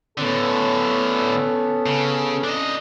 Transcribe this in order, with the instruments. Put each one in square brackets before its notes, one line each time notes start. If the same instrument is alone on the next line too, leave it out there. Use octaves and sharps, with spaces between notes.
[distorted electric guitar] A2 D3 [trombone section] B3 C#4 A4
[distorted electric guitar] C#3
D4 D#5